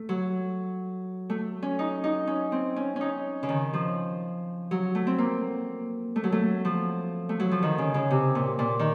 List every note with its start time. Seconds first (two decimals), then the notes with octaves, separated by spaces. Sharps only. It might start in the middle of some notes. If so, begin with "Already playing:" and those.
Already playing: A3
0.09 F#3
1.30 A3
1.63 C#4
1.79 D#4
2.04 D#4
2.27 C#4
2.52 C4
2.76 C#4
2.96 C#4 D#4
3.43 C#3
3.49 D#3
3.73 F3
4.71 F#3
4.95 A3
5.07 C4
5.18 A#3
6.16 A3
6.24 F#3
6.32 A3
6.65 F3
7.29 A3
7.40 F#3
7.51 F3
7.63 D#3
7.78 C#3
7.94 C#3
8.11 C3
8.35 A#2
8.59 A#2
8.79 D#3